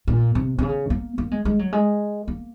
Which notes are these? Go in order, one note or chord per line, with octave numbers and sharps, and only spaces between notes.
A#2
C3
C3
C#3
A#3
A#3
G#3
G#3
F#3
G#3
A#3